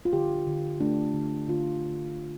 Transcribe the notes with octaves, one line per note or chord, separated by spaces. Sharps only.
F4
D3 G4
D3
A3 D4
D3
D3 F4